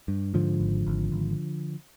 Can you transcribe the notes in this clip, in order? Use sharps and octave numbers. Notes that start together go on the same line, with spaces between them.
G2
G#2 D3 F3
G#1
G#1
G#1